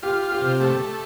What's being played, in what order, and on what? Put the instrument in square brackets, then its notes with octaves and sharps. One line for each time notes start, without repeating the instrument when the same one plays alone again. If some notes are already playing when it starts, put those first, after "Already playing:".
[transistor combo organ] F4 [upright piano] G4
[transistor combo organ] F4
[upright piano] G4
[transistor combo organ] C3
[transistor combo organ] A3 [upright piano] G4
[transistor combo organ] A3